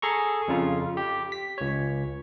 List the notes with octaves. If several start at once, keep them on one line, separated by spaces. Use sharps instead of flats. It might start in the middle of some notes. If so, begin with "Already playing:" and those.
G#4 A4 A#5 C#6
F2 C#3 F4
G4
B6
C#2 C#5